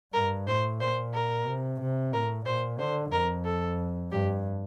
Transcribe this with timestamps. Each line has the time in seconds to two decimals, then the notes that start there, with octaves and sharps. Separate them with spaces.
0.13 G2 A#4
0.47 A2 C5
0.80 A#2 C5
1.14 A#4
1.47 C3
1.80 C3
2.13 A2 A#4
2.45 A#2 C5
2.79 D3 C5
3.12 F2 A#4
3.45 A4
4.11 G2 G4